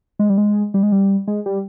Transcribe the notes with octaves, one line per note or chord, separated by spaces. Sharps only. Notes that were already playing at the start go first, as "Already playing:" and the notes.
G#3
G3
G#3
G3
G#3
G3
G#3
G3